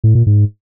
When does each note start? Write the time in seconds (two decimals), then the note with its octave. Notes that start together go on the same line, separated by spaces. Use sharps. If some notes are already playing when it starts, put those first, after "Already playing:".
0.04 A2
0.15 A#2
0.26 G#2